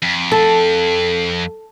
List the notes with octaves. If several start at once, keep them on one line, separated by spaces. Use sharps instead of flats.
F2
A4